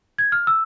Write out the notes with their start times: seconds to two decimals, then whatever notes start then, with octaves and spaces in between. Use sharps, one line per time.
0.18 G#6
0.32 F6
0.47 E6